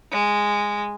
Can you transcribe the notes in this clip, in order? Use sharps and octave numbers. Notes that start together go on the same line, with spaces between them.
G#3